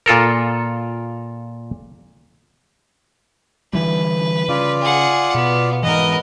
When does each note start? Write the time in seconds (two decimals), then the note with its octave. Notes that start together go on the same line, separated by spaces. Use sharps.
0.06 A#2 F4 A4 A#4
3.73 D3 E3 G3 B4
4.49 C#3 F4 D5
4.81 G#4 F#5
5.35 B2 B3
5.83 G#2 E3 B3 A#4 B4 D#5